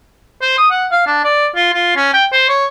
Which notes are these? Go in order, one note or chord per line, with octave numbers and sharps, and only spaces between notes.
C5
D#6
F#5
F5
D4
D5
F4
F4
C#4
G5
C5
C#5